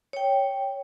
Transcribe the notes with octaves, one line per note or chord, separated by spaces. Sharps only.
C#5 G5